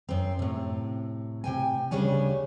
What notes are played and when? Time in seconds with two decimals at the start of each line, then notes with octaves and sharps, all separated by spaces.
0.09 F#2 C4
0.39 A2 C3
1.44 C3 G5 G#5
1.91 D2 C#3 G3 D4 C#5 G#5